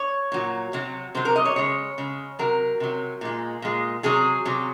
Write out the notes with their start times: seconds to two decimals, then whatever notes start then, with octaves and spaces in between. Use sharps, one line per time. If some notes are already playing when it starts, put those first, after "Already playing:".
Already playing: C#5
0.32 A#2 F#3
0.73 C3 F#3
1.15 C3 F#3 C5
1.25 A#4
1.36 D#5
1.45 C#5
1.56 C#3 G#3 C#5
1.98 C#3 G#3
2.39 C3 F#3 A#4
2.80 C3 F#3
3.21 A#2 G#3
3.62 A#2 G#3
4.03 C3 F#3 G#4
4.45 C3 F#3